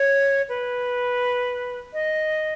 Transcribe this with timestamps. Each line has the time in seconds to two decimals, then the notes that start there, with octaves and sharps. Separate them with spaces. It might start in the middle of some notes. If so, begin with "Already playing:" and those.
Already playing: C#5
0.49 B4
1.93 D#5